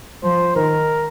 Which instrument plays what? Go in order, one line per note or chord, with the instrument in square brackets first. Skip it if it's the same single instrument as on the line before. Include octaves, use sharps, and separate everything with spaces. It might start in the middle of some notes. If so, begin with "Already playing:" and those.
[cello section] F3 [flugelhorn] C5
[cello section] D#3 [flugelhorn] A#4